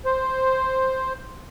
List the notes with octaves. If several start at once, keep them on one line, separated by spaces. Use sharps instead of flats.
C5